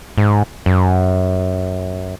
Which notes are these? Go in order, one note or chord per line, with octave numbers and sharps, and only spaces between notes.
G#2
F#2